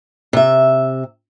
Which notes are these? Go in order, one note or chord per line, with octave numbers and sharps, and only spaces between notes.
C3 E5